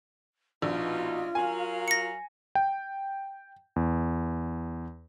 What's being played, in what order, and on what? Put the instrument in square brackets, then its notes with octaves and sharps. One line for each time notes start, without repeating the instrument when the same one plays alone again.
[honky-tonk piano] A#1 [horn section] B2 D#4 [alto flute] F4
[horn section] F#3 A#4 F5 [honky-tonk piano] G#5
[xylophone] A#6 C#7
[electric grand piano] G5
E2